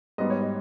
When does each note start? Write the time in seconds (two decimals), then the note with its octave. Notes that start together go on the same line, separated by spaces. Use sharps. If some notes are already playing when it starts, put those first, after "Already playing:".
0.18 G#2 G3 B3 D#5
0.30 C#5
0.41 D#5